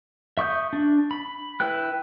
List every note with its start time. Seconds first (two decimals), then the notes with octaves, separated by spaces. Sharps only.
0.38 E5 C#6 D#6 G6
0.73 D4
1.11 B5
1.60 E4 B4 G5 F#6